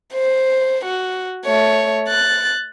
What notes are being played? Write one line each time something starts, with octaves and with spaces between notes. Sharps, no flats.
C5
F#4
A3 C#5
F#6 A6